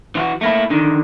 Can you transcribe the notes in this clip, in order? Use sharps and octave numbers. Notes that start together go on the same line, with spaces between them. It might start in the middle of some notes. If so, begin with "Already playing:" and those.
E3 F4 F#4
A3 A#3 E4
D3 D#3